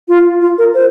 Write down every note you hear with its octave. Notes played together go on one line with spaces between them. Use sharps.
F4
F4
A#4
C5